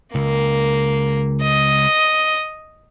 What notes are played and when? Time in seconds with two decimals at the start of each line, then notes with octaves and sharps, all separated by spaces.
0.15 C#2 A#3
1.43 D#5